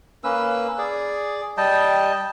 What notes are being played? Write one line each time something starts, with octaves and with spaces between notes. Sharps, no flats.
A#3 C#4 B4 E6
G#4 D5
G3 D#5 G5 A5